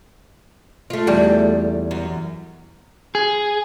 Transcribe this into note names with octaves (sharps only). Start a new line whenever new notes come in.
A3 F4
E2 G3
F#2
G#4